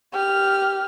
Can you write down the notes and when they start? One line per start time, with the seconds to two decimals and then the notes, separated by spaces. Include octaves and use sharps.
0.13 G4 F6